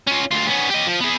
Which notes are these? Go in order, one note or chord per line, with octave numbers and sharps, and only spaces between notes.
C#4 F4
D2 F4
B3 C#4
G4 D#5
F3
B3 G#4